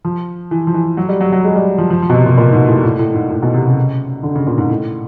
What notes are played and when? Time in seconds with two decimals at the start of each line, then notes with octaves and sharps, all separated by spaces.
0.05 F3
0.51 E3
0.67 F3
0.74 E3
0.97 F#3
1.09 G3
1.21 F#3
1.32 F#3
1.44 G#3
1.56 G3
1.78 F3
1.90 F3
2.02 F3
2.09 B2
2.14 C3
2.26 A#2
2.38 A#2
2.52 G#2
2.68 A2
2.84 A2
2.99 A2
3.14 G#2
3.30 A2
3.42 B2
3.54 C3
3.66 C#3
4.23 D3
4.35 C#3
4.47 A#2
4.58 G#2
4.70 A2